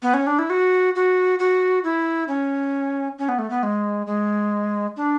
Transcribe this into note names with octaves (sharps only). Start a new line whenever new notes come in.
B3
C#4
D4
E4
F#4
F#4
F#4
E4
C#4
C#4
B3
A3
B3
G#3
G#3
D4